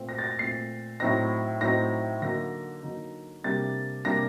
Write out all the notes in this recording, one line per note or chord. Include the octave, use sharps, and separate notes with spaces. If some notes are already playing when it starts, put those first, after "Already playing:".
Already playing: A#2 A3 C4
A#6
A6
A#6
A#2 A3 C4 C7
A2 F#3 C4 D#4 A#6
A2 F#3 C4 D#4 A#6
D3 F#3 A#3 D#4 A#6
D3 F#3 A#3 D#4
C3 G3 A#3 D4 A6
C3 G3 A#3 D4 A#6